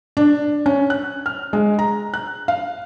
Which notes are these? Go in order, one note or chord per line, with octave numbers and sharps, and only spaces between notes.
D4
C#4
F#6
F6
G#3
A#5
F#6
F5